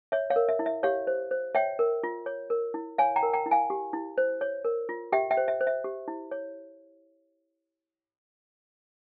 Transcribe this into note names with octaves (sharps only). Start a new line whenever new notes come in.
C#5 E5
C#5 F5
A#4
E5
E4
E5
G4 C#5 F5
C5
C5
C#5 E5 G5
A#4
F4
C#5
A#4
E4
C#5 F5 G#5
G5 A#5
A#4
G5 A#5
E4
F5 G#5
G4
E4
C5
C#5
A#4
F4
G4 E5 G5
E5 G5
C5
E5
C5
E5
G4
E4
C#5